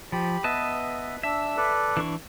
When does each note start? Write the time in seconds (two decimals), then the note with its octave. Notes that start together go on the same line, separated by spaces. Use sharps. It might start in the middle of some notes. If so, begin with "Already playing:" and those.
0.12 F3 G4 B5
0.44 B3 B4 D#5 E5 A5
1.23 D4 E5 E6
1.57 A4 B4 D5
1.97 E3 D4 C#6